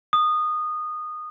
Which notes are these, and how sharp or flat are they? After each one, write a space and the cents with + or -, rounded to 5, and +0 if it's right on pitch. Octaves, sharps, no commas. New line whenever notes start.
D#6 -20